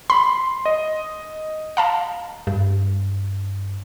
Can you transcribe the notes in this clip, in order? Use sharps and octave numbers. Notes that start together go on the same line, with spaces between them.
B5 C6
D#5
F5 A5 A#5
G2